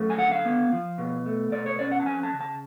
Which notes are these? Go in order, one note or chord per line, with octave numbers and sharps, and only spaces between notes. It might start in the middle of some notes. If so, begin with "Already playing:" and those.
Already playing: F#2 A3
G#5
D3 F#5
F5
B3
F3
B2
A3
B2 D5
C#5
C#4 D5
F#5
A5
F2 G#5
A5
C#3
A5